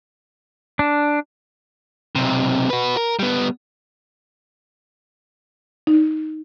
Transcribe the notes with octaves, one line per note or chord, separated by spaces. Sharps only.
D4
B1 C3
F#4 B4
A#4
G3 B3
D#4